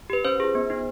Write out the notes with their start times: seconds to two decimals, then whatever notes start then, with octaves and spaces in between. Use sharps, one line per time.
0.10 G4 B4
0.25 C#4 C5
0.40 F4 G#4
0.55 B3
0.70 D#4 G#4